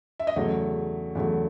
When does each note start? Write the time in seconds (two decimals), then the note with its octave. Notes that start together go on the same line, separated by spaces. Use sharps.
0.20 E5
0.27 D#5
0.36 E2 C#3 F#3 A3 C#5
1.15 E2 C#3 F#3 A3